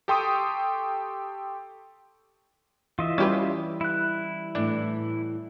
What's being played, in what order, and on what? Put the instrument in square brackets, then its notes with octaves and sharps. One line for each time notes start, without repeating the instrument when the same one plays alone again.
[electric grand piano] G4 A4 G5 C6 C#6 D#6
[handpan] E3 [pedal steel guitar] F4 D#5 E5
[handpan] G3 [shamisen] C#4 G4 B4
[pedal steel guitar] E4 F#6
[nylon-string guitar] A2 E3 [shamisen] D4